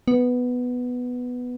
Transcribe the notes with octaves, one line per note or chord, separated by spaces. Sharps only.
B3